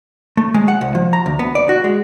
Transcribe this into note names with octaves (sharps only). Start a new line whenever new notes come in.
A3
G#3
F#5
C2
F3
A#5
D2
B3
D5
F#4
G#3